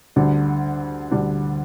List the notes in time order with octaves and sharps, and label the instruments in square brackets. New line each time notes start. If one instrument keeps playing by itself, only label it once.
[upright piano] D2 D3 G3 D4
D2 D3 G3 D4